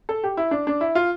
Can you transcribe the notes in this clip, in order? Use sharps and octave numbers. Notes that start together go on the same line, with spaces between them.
A4
G4
E4
D4
D4
E4
F4